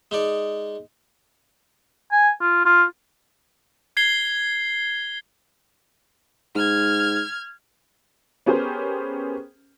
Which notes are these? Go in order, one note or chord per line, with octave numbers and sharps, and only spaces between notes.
G#3 D#4 D5
G#5
F4
F4
G#6 C7 G7
G#2 F6 G#6
B3 C#4 G4 G#4 A#4 C5